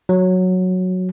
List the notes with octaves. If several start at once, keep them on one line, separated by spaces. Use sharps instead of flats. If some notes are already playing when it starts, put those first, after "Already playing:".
F#3